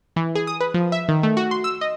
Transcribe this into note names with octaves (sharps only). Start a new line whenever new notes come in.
E3
G#4
D#6
B4
F3
E5
D#3
A3
F#4
C6
E6
D#5